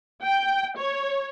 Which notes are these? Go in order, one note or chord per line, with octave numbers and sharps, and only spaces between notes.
G5
C#5